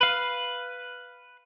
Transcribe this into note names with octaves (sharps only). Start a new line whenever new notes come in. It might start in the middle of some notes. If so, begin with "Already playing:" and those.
B4 F5